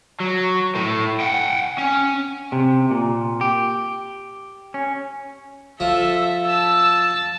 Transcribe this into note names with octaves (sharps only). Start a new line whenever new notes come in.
F#3
A2 A3
F#5 G5
C#4
C3
A#2
G4
C#4
F3 A4 E5
A5 E6